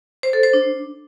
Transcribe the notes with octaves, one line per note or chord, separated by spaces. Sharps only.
C5
A4
C5
D4